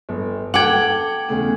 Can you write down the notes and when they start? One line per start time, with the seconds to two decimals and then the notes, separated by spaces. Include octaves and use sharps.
0.09 G1
0.54 A4 F#5 G5 D6 G#6 F#7
1.29 E2 C#3 A3